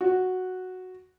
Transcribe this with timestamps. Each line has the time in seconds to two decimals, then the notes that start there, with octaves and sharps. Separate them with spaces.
0.01 F#4